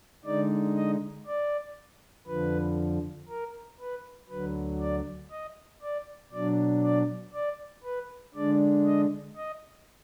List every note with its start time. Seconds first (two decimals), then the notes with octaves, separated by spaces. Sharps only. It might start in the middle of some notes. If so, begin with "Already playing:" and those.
0.25 D3 G#3 D#4 D5
0.76 D#5
1.26 D5
2.27 F2 D3 F3 B4
3.29 A#4
3.80 B4
4.30 D2 D3 F#3 B4
4.80 D5
5.31 D#5
5.82 D5
6.32 B2 F#3 D4 D5
6.83 D5
7.34 D5
7.84 B4
8.35 D3 G#3 D4 D5
8.86 D#5
9.36 D#5